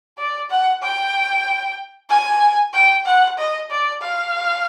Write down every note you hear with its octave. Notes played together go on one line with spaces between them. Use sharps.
D5
F#5
G5
G#5
G5
F#5
D#5
D5
F5